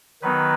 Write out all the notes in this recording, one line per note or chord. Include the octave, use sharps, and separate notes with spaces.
D#3 F#3 B3 D#4 B4